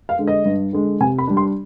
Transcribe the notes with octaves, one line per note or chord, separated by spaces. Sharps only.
F5
D3 G#3
D#5
G2
D3 G#3
C3 G#5
B5
G3 D4
C6